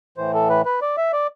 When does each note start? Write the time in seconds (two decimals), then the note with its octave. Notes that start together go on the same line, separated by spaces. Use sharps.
0.17 A2 E3 C5
0.34 A4
0.50 B4
0.65 B4
0.82 D5
0.97 E5
1.13 D5